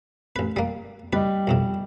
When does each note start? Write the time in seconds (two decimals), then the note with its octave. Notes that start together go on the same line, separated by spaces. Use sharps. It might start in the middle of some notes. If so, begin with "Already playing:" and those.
0.36 A1 B4
0.56 G3 A#3
1.13 G3 B4 D#5
1.47 B1 F2 C3